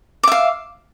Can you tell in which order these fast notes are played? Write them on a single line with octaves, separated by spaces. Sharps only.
D6 E5 F5